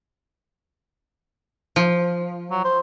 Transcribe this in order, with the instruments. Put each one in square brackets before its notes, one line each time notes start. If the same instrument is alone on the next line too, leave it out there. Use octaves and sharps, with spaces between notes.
[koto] F3
[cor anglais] F#3
C5